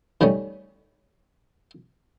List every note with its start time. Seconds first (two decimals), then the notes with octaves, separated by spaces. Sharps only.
0.21 D#3 G3 A3 C#4